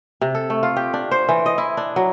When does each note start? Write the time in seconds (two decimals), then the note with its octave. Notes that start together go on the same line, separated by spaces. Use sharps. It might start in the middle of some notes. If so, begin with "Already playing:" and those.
0.21 C3
0.35 A4
0.50 A3
0.63 F4
0.76 G4
0.94 D4
1.11 C5
1.29 E3
1.46 D#5
1.58 E4
1.77 D4
1.96 F#3